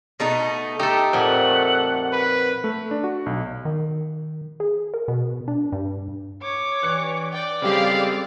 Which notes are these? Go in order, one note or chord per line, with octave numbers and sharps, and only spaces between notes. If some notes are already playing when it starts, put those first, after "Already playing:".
B2 A3 D#4
A3 D#4 G4 A4
F2 A#2 F#5
B4
A3
D4
F#4
B1
D#3
G#4
A#4
B2
D4
G2
C#5 D6
G2 E3 F#6 C#7
D5 G5
C#3 G3 G#3 C4 G4 A4 F5